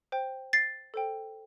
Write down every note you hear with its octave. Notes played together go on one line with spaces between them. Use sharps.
C5 G5
A6 C7
A4 C5 G5